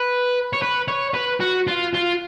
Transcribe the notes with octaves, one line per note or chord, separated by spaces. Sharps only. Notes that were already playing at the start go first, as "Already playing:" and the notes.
Already playing: B4
C#5
B4
C#5
B4
F#4
F4
F4